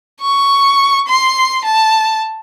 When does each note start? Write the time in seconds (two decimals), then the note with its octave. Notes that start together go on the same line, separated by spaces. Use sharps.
0.21 C#6
1.08 C6
1.65 A5